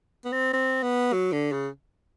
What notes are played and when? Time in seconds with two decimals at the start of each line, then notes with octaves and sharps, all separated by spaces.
0.25 B3
0.33 C4
0.53 C4
0.83 B3
1.13 F#3
1.32 D3
1.52 C#3